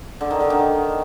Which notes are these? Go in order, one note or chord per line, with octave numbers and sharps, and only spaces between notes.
D3
D#3
D3
D#3